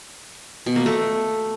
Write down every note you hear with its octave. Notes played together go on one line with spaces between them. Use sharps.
B2
A#3
A3